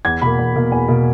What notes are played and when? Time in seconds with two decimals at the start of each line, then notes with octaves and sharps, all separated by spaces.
0.05 E2 G#6
0.21 B2 A#3 B5
0.39 E2
0.55 B2 A#3
0.72 E2 G#5
0.88 B2 A#3